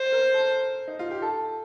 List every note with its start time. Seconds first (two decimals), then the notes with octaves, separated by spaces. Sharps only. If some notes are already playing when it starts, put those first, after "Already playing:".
Already playing: C5
0.12 A#4
0.34 A4
0.88 D#4
0.99 F4
1.11 G4
1.22 A4